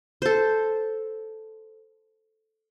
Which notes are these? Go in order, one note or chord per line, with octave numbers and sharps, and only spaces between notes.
A4 C5